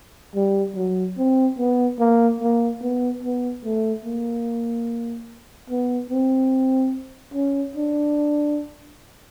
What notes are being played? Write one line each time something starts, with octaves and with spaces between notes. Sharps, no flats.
G3
F#3
C4
B3
A#3
A#3
B3
B3
A3
A#3
B3
C4
C#4
D4